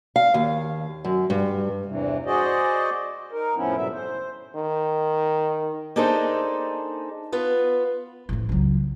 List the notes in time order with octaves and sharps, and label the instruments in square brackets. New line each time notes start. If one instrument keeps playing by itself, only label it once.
[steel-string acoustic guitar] F5
D#2
F#2
G2
[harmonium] E2 G2 C3 E3
F#4 G#4 C5 D5 D#5
D#4 A#4
F2 A2 F3 B3 C#4 E4
G#2 B2 D3 F#3 G3 E5
C5
[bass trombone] D#3
[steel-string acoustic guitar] A#3 D4 D#4 G#4 A4 C5
B3 F4 B4
[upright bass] A1 F2
C#2 F#3